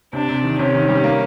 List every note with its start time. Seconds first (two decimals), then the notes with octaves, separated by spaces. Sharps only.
0.13 C3 D4
0.28 C3
0.44 D#3
0.59 C3 C#4
0.74 D#3
0.89 G3
1.04 A#3